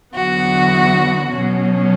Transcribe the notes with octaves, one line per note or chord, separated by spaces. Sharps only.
E2 D3 F#3 B3 F#4
B2 F#3 C#4